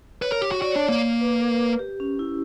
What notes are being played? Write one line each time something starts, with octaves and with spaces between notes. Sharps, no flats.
B4 C#5
A#4
G4
F#4
F#4 D5
D4 C#5
D5
A#3
B4
A#4
G4
C#4
E4